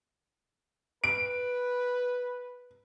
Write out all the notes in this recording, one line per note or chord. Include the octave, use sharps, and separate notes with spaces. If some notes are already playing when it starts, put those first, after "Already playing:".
B4 D7